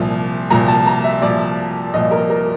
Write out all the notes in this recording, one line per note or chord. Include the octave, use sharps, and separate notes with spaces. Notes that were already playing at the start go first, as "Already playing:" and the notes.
Already playing: C2 A#2 F3
C2 A#2 F3 A#5
A5
A#5
E5
C2 A#2 F3 D5
C2 A#2 F3 D#5
A#4
A#4